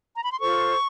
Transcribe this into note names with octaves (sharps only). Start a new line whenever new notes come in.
A#5
B5
C6
F4 A4 C5 C#6